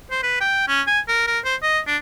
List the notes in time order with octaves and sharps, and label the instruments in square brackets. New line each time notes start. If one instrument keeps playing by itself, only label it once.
[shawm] C5
B4
G5
C#4
G#5
A#4
A#4
C5
D#5
D4